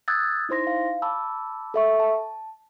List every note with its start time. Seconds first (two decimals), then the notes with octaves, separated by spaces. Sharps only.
0.08 D#6 E6 F#6 G#6 A6
0.49 D#4 E4 C5 C6 A#6
0.67 F5
1.02 A5 B5 D6 E6
1.74 A4 E5 C#6
2.00 A5